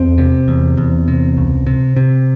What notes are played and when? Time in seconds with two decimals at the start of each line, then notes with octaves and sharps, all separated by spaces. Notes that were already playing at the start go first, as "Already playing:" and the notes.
Already playing: E2 C4
0.18 C3
0.48 E2
0.77 E2
1.08 C3
1.37 C#2
1.67 C3
1.96 C3